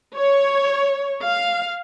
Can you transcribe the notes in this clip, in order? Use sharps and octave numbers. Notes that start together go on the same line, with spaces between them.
C#5
F5